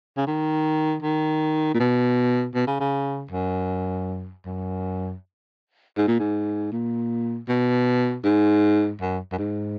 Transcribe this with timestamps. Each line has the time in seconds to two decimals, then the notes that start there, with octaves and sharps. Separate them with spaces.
0.17 C#3
0.27 D#3
1.03 D#3
1.74 A#2
1.80 B2
2.54 B2
2.67 C#3
2.80 C#3
3.31 F#2
4.46 F#2
5.97 G#2
6.08 A#2
6.19 G#2
6.72 A#2
7.48 B2
8.24 G#2
9.01 F#2
9.32 F#2
9.38 G#2